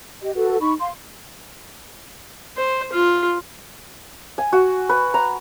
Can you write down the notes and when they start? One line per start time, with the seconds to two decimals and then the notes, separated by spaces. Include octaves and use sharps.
0.22 G4 D#5
0.35 F#4 A4 B4
0.60 D#4 B5 C#6
0.80 F5 C6
2.57 C5
2.93 F4
4.38 G#5
4.53 F#4
4.89 B4
5.14 A#5